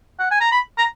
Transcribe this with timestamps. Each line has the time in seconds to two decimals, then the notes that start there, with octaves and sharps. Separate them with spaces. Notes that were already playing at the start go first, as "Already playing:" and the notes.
0.19 F#5
0.31 G#5
0.41 A#5
0.51 B5
0.78 A#5